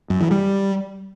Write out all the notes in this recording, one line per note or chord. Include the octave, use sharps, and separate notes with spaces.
F#2
E3
G3